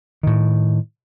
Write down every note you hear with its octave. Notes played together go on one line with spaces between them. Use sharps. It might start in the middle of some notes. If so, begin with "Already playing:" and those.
A2 D#3